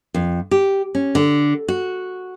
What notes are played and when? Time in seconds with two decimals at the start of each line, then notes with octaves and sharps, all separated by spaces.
0.14 F2
0.51 G4
0.95 C#4
1.15 D3
1.68 F#4